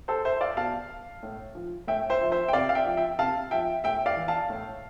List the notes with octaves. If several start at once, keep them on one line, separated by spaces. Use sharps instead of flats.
A4 C5
C5 E5
D5 F5
B2 F5 A5
A2
F3
A2 E5 G5
C5 E5
F3
C5 E5
G5
C3 D5 F5
F5
E5 G5
F3
E5 G5
C3 F5 A5
F3 E5 G5
A2 E5 G5
D5 F5
E3
F5 A5
A2